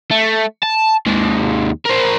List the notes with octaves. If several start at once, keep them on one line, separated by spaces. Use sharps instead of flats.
A3
A5
D#2 G#3
A#4 C5